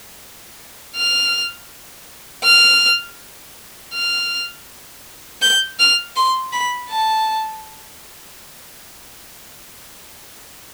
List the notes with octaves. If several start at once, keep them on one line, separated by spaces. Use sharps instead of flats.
F6
F6
F6
G6
F6
C6
B5
A5